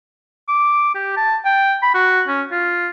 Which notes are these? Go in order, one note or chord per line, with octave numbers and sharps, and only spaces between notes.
D6
G4
A5
G5
B5
F#4
C#4
F4